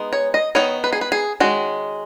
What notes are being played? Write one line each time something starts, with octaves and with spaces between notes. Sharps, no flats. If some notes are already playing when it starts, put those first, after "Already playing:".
Already playing: G#3 B3 D#4
C#5
D#5
D#3 B3 D#4 C#5
B4
G#4
B4
G#4
D#3 G#3 C#4 F#4